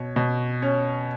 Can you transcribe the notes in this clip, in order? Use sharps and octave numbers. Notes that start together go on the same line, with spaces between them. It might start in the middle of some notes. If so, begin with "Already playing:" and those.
Already playing: B2 C#5
B2
C#4